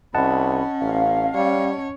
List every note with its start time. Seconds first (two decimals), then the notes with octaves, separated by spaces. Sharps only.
0.15 C2 C#4 D#5 F#5 A5 B5
0.81 A1 F5
1.35 G3 C#4 C#5